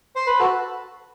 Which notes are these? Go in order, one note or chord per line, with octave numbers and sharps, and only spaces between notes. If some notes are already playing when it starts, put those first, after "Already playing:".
C5
B4
F#4 A4